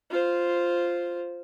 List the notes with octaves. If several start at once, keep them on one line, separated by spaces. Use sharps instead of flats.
F4 C5